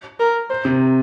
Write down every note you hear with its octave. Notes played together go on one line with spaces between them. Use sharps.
A#4
C5
C3